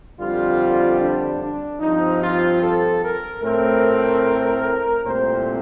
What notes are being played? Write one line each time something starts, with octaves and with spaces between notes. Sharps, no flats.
F2 D3 G3 C4 F4
D4
D4
G2 F3 C4 D#4
F4
A4
A#4
A2 A3 C4 A#4
C2 A#2 A3 C4 C5